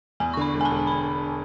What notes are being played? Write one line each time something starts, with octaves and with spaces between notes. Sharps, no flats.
E2 G#5
C#6
D3 B5
E1
G#5
A5
E1
B5